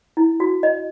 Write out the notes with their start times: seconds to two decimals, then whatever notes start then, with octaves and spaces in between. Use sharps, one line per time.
0.17 E4
0.40 F#4
0.63 D#5